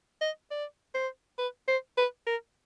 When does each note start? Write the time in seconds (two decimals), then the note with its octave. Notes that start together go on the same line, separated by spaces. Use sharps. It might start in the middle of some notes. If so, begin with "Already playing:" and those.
0.21 D#5
0.51 D5
0.94 C5
1.38 B4
1.68 C5
1.97 B4
2.27 A#4